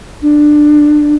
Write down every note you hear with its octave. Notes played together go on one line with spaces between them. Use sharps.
D4